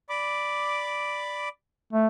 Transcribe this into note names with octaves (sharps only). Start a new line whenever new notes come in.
D5 B5 D6
A3